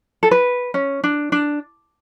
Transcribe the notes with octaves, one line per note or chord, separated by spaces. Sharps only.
A4
B4
C#4
D4
D4